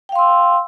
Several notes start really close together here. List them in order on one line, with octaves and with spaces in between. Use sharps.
G5 F5 C6 E6